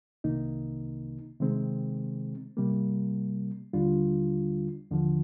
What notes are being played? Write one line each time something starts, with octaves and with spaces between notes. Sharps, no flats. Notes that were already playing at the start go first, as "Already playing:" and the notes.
C2 C3 D#3 A#3 D#4
C3 D#3 G#3 C4
C3 G3 A#3
D#2 D3 G3 D4 F4
D#2 D3 F3